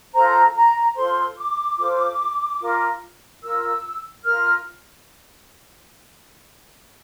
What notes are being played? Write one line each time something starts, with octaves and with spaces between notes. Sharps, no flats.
F4 A4 C5 A#5
A#5
F4 A4 C5 C6
D6
F4 A4 C5
F4 A#4
F4 A#4 E6
F4 A#4 F6